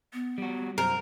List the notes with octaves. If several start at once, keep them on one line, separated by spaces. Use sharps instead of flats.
B3
G3 F#4
F#2 A#4 C5